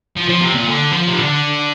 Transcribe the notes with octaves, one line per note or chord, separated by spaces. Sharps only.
F3
F3
C3
A#2
D3
F3
C3
D3